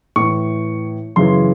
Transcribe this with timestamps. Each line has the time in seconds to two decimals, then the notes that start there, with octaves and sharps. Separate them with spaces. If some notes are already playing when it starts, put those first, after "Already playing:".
0.16 A2 E3 C#6
1.16 F#2 C#3 E3 C6